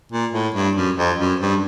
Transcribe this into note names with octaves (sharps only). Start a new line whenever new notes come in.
A#2
A2
G2
F#2
F2
F#2
G2